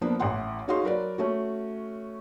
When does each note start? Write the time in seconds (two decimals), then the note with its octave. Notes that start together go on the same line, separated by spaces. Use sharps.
0.01 F3 A#3 B3 D4
0.19 A1 E3 F#5 C6
0.68 C#4 D#4 F#4 G#4 F5 C6
0.83 F#3 A#4 B4 D5
1.18 A3 C#4 F#4